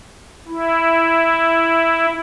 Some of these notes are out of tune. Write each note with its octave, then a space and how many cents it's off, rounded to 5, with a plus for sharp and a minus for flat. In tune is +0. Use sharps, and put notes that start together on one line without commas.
E4 +0